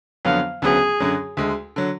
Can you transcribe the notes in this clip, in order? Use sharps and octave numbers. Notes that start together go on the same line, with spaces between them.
F2 D3 F#3 B3 F5
D2 C#3 F#3 B3 G#4
F#2 D3 F#3
D2 D3 G#3
D3 F#3